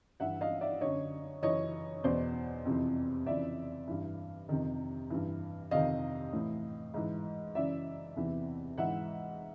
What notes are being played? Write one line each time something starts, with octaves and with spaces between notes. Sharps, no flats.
G2 E3 E5 F#5
D#5 F5
D5 E5
F#2 D3 C#5 D#5
F#2 C#3 E3 C#5 D#5
E2 B2 C5 D5
F2 C3 E3
F2 C#3 E3 D5 E5
G2 E3
F2 C3 D#3
G2 E3
F2 C3 D#3 D#5 F5
A2 E3
G#2 E3
F#2 C#3 E3 D5 E5
E2 C3 E3
G#2 E3 E5 F#5